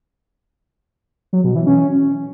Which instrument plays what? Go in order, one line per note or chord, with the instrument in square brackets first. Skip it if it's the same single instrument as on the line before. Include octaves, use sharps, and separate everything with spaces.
[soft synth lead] F#3
B2
E3
C#4